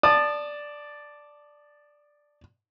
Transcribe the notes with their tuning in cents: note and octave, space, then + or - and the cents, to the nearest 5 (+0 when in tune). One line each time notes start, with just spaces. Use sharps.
D5 +0 A5 +0 D#6 -35